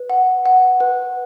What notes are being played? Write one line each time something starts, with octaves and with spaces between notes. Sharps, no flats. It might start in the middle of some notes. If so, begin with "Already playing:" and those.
Already playing: B4
F#5
F#5
B4